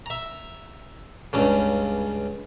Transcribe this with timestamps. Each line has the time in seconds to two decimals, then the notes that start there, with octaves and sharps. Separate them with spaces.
0.06 E5 A#5
1.33 C#2 G2 C#3